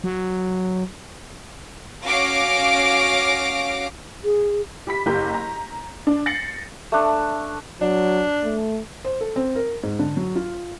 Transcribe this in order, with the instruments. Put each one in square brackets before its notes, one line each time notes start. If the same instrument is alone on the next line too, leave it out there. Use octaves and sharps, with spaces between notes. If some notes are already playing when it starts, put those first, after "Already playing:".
[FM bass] F#3
[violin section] C#4 F#4 F5 D6 A#6 D7
[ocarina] G#4
[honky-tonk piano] G4 B5 B6
F#1 G4 A#5 G6
A#5
D4
A6 A#6 C7 C#7 F#7
[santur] A3 D4
[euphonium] F#3 [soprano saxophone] D4
[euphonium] A3
[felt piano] C5
A4
C4
A#4
G#2
D3
F#3
F4